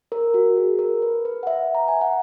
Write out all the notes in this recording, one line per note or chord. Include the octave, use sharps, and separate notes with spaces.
A#4
F#4
G#4
A#4
B4
B4
F#5
E5
A#5
G#5
F#5